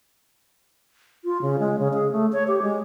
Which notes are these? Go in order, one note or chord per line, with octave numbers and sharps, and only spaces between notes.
F4
C#3
G#3
C#3
G#4
A3
C#5
G4
G#3